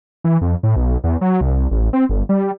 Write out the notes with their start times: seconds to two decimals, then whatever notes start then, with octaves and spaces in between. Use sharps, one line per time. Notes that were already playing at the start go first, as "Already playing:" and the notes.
0.24 E3
0.41 F2
0.63 A2
0.76 B1
1.04 E2
1.21 F#3
1.41 C2
1.71 A1
1.93 C4
2.09 G1
2.29 G3